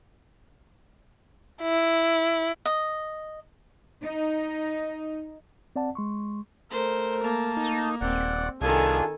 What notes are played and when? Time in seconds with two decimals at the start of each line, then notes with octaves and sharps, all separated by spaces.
1.62 E4
2.65 D#5
4.03 D#4
5.76 C4 D5 F#5 A5
5.95 G#3 C6 C#6
6.71 A3 A#4 C5
7.24 A#3 A5
7.57 D#4
8.01 D#1 C4 D5 F#5
8.61 C2 D#3 D4 F4 G#4 A4 G#5